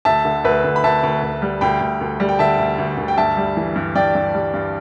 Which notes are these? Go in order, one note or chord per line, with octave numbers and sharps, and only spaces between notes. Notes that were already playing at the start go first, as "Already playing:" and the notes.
D2 E5 A5
D3
D2 B4 E5
D2
B5
D2 E5 A5
D2
D2
G3
D2 G5 B5
D2
D2
G3
G5
D3 E5 A5
D2
D2
D2
G5
G2 E5 A5
G3
E3
G2
G2 D5 G5
G2
G3
G2